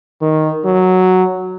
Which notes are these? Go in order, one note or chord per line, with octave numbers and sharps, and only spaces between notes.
D#3
F#3